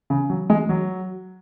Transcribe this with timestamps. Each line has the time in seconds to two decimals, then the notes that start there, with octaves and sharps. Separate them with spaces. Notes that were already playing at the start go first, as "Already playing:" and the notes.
0.10 C#3
0.30 F#3
0.50 G#3
0.69 F#3